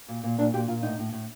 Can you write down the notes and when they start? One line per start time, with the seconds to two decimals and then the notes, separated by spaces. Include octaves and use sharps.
0.08 A#2
0.23 A#2
0.38 A#2 D4
0.53 A#2 G4
0.68 A#2 F4
0.83 A2 D#4
0.99 A2
1.13 A2